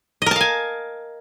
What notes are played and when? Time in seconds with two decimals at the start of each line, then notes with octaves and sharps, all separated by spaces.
0.22 D#5
0.26 A#4
0.31 A5
0.36 F5
0.41 G#5